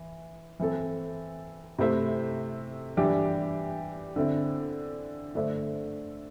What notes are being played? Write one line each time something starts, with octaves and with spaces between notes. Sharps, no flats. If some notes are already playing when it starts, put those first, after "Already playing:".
Already playing: E3
E3 C4 A4
C3 A3 E4 C5 E5
E3 G3 D4 G4
D3 C4 E4
D3 A3 D4 C5 E5